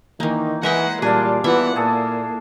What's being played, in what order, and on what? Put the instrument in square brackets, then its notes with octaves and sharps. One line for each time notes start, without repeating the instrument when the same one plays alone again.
[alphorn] D#3 [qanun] E3 A#3 [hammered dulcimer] D#4
[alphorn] E3 [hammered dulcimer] G#3 G#4 [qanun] A#4 E5 G5 [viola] F#5
[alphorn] A#2 [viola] G3 [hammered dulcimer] D4 D5 F5 [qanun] G#4
[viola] E3 F#5 [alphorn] B3 [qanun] E4 F4 E5
[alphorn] A#2 [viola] A#3 [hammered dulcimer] G#4 A4